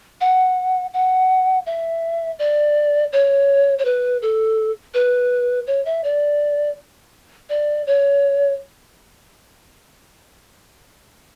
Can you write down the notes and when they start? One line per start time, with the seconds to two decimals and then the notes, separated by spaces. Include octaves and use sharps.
0.21 F#5
0.93 F#5
1.66 E5
2.39 D5
3.13 C#5
3.78 C#5
3.85 B4
4.22 A4
4.94 B4
5.67 C#5
5.85 E5
6.04 D5
7.49 D5
7.87 C#5